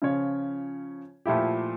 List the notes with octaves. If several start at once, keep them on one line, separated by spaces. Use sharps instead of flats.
C#3 F3 C#4 F4 C#5
A#2 F3 A3 E4 G4